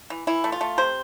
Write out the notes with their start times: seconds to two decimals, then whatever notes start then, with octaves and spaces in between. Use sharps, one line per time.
0.10 E3
0.27 E3 E4
0.44 A3
0.52 F4
0.61 A3
0.78 C3 C5